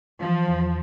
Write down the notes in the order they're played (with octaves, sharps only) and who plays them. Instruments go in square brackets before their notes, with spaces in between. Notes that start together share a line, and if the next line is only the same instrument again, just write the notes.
[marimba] E3 [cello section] F3
[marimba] E2